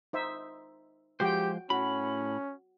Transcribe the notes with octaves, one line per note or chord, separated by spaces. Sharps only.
D#4 C5 E5
F3 G#3 F#4 G4 C5 G5
A2 C#4 F#4 B5